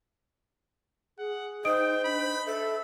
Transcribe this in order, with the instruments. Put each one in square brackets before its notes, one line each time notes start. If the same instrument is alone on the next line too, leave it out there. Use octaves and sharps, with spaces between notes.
[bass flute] G#4 [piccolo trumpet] F#5
[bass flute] D#4 [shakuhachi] C5 [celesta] D#5 D#6 D7 [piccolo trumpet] G5
[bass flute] D4 [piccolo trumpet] B5
[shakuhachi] A4 [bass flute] E5